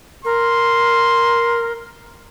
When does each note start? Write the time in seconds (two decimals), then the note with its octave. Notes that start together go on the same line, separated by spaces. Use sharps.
0.25 A#4 C6